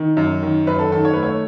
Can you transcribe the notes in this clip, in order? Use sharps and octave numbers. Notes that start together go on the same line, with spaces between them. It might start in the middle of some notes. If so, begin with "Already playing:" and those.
Already playing: D#3
F#2
D#3
F#2 B4
A4
D#3 A4
C#5
A3 B4
C#5